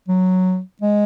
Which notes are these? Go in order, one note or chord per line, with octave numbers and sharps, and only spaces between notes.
F#3
G#3